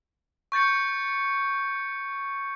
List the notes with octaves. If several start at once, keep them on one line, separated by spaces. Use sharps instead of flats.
C#6 G6 A6 C#7